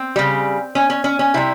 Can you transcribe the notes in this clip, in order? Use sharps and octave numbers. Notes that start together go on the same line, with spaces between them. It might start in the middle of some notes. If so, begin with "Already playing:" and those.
Already playing: C4
C#3 G3
C#4
C#4
C#4
C#4
C3 G3 E4